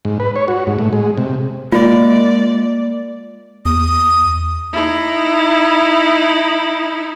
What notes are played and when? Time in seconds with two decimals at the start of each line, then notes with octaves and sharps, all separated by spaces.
0.05 G#2
0.20 B4
0.36 C#5
0.48 F#4
0.67 G#2
0.79 A2
0.93 G#3
1.17 C3
1.72 G#3 A#3 F4 D5
3.65 E2 D#6
4.73 D#4 E4